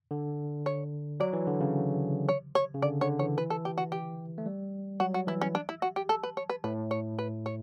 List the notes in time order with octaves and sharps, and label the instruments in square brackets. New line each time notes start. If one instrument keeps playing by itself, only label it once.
[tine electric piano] D3
[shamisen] C#5
[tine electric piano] F#3 [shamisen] D5
[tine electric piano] E3
D3
C#3
[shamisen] C#5
C#5
[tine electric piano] C#3
[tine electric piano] D3 [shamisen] D5
[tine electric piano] D3 [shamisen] C#5
[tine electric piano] E3 [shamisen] C#5
[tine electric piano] E3 [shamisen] B4
[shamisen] A4
G4
F#4
G4
[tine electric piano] A3
G3
[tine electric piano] F#3 [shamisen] F#4
[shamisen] F#4
[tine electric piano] E3 [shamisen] E4
[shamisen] C#4
D4
E4
F#4
G4
A4
B4
C#5
B4
[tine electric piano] A2 [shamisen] B4
[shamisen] C#5
B4
C#5